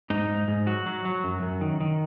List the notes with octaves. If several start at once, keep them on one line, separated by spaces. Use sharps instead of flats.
G#2 D#4
G#2
G#2
F#3 F#4
F#3
F#3
F#2
F#2
D#3
D#3